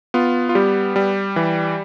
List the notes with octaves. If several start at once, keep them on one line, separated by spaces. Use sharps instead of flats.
B3 F4
F4
G3 G4
G3
E3